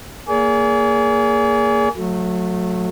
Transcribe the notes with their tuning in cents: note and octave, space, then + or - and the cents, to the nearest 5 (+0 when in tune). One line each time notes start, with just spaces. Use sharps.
A#3 +0 G#4 +0 D5 -45
F#3 -30 A3 +0